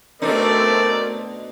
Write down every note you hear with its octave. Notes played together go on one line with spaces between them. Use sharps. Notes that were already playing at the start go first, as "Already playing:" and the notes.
B2 A3 C4 D4 D#4 A#4 D5